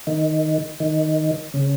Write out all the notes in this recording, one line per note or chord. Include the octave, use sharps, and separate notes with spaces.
D#3
D#3
C#3